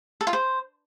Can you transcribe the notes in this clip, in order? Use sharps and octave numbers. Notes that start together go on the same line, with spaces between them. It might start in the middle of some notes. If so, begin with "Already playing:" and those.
A4
F4
C5